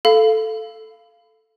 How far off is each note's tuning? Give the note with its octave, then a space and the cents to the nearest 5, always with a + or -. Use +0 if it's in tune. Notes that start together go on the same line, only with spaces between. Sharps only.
A4 +0 F5 -10 B5 +25